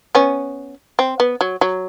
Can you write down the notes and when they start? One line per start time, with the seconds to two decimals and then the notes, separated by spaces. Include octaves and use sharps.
0.15 B3 C#4
0.99 C4
1.20 B3
1.41 F#3
1.61 F#3